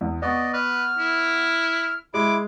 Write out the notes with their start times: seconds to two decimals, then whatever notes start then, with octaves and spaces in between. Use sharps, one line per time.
0.01 E2
0.22 B3 D5 D#5 C#6
0.53 B4 F6
0.98 E4
2.14 G#3 E4 D6